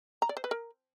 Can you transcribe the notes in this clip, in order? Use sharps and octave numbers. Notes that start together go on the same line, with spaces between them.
A#5
D5
C5
B4
A#4